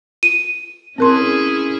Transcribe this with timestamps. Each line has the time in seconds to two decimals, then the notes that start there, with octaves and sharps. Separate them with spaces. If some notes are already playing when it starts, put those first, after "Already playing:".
0.23 D#7
0.98 C4 C#4 E4 G#4 A#4 C6